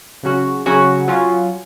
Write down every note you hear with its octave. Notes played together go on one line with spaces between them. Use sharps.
C#3 F#3 C#4 F#4
C#3 F#3 C#4 F#4
F#3 C#4 F4